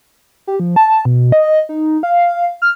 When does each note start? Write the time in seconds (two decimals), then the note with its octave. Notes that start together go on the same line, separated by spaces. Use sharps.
0.47 G4
0.60 F3
0.76 A5
1.05 B2
1.32 D#5
1.69 D#4
2.03 F5
2.62 F6